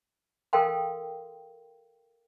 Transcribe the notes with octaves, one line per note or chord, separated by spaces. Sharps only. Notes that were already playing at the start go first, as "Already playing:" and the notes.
A4 A#4 F5 G5 C6